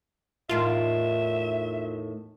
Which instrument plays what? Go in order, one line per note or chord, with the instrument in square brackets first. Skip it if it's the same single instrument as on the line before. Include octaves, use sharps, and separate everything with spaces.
[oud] E2 A2 D#3 [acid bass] F4 [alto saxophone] E5